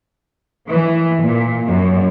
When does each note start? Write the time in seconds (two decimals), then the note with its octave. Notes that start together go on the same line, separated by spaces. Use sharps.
0.69 E3
1.22 A#2
1.67 F#2